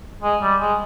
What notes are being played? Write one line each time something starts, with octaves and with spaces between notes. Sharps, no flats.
G#3
G3
G#3